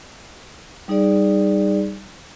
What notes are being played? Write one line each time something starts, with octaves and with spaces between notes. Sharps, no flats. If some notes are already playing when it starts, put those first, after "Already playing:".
G3 D#4 G#4 D5